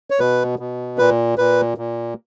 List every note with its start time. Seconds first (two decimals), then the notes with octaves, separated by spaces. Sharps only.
0.10 C#5
0.20 B2 B4
0.59 B2
0.98 A#2 B4
1.38 A#2 B4
1.78 A#2